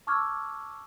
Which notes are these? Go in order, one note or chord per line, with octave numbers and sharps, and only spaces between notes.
A5 C#6 D6 E6 F6 G#6